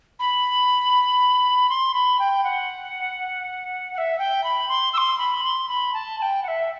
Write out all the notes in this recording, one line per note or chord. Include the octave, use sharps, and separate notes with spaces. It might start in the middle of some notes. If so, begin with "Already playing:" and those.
B5
C6
B5
G5
F#5
F#5
E5
G5
B5
C6
E6
C6
B5
C6
B5
A5
A5
G5
F#5
E5